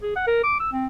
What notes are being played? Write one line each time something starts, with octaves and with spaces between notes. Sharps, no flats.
G#4
F#5
A#4
D6
E6
C4